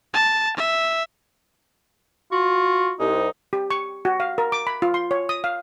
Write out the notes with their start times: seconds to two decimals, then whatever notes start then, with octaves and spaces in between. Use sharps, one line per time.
0.14 A5
0.57 E5
2.32 F4 F#4
2.99 C2 D#4
3.53 G4
3.70 C#6
4.05 F#4
4.20 F5
4.38 A#4
4.52 D6
4.67 B5
4.82 F4
4.94 C6
5.11 C#5
5.29 D#6
5.44 F5